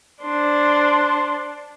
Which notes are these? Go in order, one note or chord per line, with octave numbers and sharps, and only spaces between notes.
D4 C5